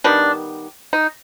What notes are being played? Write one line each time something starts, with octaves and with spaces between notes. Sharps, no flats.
D#3 G3 B3 D4
D#4